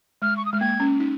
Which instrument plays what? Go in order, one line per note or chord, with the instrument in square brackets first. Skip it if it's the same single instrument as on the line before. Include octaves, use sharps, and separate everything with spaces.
[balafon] G#3 [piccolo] F6
[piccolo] C#6
D#6
[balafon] G#3 [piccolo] F6
[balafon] A#3 [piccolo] G#6
[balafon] C#4
D#4